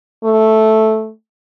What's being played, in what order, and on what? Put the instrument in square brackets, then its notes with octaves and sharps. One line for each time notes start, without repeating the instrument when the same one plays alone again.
[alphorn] A3